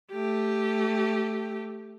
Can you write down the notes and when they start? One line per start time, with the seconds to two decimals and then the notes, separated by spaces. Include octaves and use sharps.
0.11 A3 G4